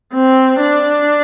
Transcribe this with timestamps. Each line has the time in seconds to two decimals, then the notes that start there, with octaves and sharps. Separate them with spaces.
0.14 C4
0.61 D4